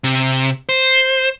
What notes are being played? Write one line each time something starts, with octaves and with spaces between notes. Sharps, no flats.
C3
C5